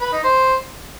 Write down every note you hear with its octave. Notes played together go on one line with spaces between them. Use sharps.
B4
D#4
C5